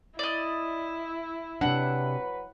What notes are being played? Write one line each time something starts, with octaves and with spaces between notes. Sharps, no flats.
E4 D5 D#5
C3 F#3 D4 B4 F#5